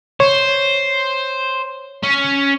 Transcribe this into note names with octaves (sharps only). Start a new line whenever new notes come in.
C5 C#5
C#4